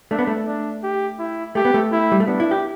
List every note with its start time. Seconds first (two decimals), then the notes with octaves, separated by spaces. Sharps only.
0.11 A3 D4
0.19 B3
0.27 A3
0.47 D4
0.83 G4
1.19 E4
1.55 A3 G4
1.65 B3
1.74 A3
1.92 E4
2.12 G3
2.20 A3
2.27 B3 D4
2.40 E4
2.51 G4